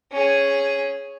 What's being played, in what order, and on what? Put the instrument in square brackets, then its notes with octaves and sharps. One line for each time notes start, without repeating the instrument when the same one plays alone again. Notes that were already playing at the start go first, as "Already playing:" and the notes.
[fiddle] C#4 G#4